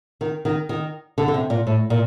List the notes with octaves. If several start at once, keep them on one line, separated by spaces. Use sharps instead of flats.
D#3
D#3
D#3
D3
D3
C3
A#2
A2
A#2